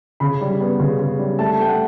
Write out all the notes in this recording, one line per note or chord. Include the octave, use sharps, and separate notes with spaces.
C#3 B5
G3
B3
C#3
C#3
G3
A3 A5
A3 G5
F#5